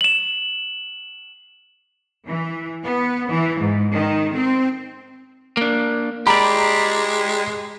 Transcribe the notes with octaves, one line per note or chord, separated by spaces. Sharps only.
E7 F#7
E3
B3
E3
G#2
D#3
C4
A#3 D4
G#3 G4 D5 A#5 B5